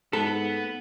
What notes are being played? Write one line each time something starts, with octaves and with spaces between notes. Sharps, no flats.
G#2 B3 A4